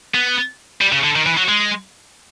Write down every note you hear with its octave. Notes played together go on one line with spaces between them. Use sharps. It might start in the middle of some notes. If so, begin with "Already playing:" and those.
B3
G3
C#3
D3
D#3
E3
F#3
G#3